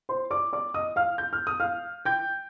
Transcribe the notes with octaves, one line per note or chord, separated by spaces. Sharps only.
C5 C6
D5 D6
D5 D6
D#5 D#6
F5 F6
G6
F6
D#6
F5 F6
G5 G6